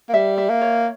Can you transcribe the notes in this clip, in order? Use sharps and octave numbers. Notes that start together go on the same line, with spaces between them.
A#3
G3 E5
E5
A#3
C#5